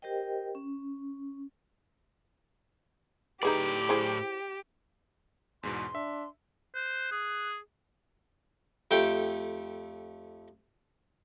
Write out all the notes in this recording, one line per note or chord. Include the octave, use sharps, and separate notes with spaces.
G4 A#4 C5 D#5 G5
C#4
A2 D#4 G4 G#4 B4 D5
E4 G#4 C5
E2 G#2 B2 C6
D4 E5
C5 F#6
G#4
F2 A3 G4 G5